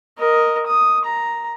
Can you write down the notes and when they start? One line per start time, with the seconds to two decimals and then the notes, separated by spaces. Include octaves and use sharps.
0.18 A#4 D#5
0.67 D#6
1.05 A#5